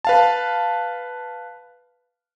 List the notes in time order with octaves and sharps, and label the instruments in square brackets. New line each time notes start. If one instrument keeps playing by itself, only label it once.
[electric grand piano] B4 F5 A5